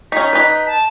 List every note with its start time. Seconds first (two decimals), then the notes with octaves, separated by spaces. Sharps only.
0.12 C#4 D#4 B6
0.33 D#4 B4
0.66 A5